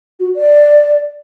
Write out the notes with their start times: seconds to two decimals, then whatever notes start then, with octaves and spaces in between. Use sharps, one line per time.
0.19 F#4
0.36 D5